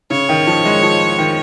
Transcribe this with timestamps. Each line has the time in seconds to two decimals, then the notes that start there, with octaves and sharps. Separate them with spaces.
0.10 C#3 C#5
0.29 D#3
0.47 F3
0.65 G#3
0.82 F3
1.18 D#3